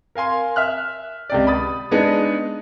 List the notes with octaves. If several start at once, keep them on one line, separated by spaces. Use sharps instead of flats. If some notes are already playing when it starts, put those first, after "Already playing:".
A#4 F5 G#5 C6
E5 F6 F#6
C#2 C3 D5
B5 D#6 A6
G#3 B3 D4 D#4 G#4